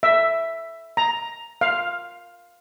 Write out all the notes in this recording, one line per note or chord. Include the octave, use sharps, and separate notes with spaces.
E5
A#5
F5